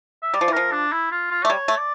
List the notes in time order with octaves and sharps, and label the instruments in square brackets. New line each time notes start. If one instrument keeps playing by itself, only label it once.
[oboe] E5
[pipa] G3 [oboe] D5
[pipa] F3
E3
[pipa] F3 [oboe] A#4
[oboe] D4
E4
F4
F4
[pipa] A3 [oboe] D5
[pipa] G3 [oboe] C#5
[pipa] A3
[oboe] D5